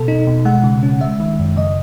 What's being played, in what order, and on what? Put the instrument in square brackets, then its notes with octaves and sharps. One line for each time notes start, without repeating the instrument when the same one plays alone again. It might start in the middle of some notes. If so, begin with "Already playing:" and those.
Already playing: [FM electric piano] B2 A4
D#4
B2
G#3 F#5
C#3
C#4
G#3 E5
D#3
F#2
C#3 D#5